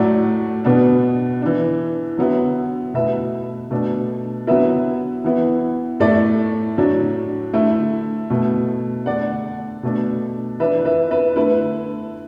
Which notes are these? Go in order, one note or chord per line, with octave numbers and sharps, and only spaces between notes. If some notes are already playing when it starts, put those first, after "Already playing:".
Already playing: A2 F#3 A3 D5 F#5
B2 B3 D4
E3 D4
D3 F#3 B3 E4
B2 A3 E4 B4 E5
B2 A3 D4
D3 F#3 B3 E4 B4 E5
E3 B3 E4
A2 A3 E4 A4 D5
A2 F#3 D4
D3 A3 E4
B2 A3 E4
D3 A3 D4 D5 F#5
B2 A3 D4
E3 D4 B4 E5
B4 E5
B4 E5
D3 A3 E4 B4